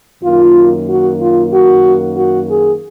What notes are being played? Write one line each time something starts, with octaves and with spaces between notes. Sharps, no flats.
F#2 D#3 A#3 F4
F#4
F4
F#4
F#4
G#4